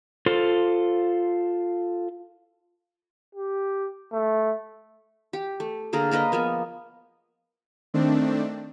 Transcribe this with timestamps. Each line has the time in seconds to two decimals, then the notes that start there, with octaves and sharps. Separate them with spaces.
0.26 F4 A4 C5
3.35 G4
4.13 A3
5.33 G4
5.60 A3
5.93 D3 A#3 G#4 A#4
6.11 A#3 A#4 B4 D#5
6.32 F3 A#3 B3 G#5
7.94 D#3 A3 C4 D4